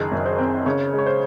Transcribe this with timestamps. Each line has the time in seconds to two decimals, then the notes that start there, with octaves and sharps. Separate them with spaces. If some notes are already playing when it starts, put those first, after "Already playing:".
Already playing: F#1 D#3 G#4
0.12 F#2
0.26 C5
0.38 C4
0.66 C#3 C#5
0.93 G#3 C#5
1.06 C5